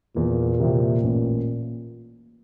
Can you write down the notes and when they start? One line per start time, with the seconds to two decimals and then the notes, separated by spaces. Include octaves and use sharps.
0.16 E2 A#2
0.60 C3 E3 G#3 C4
1.03 A1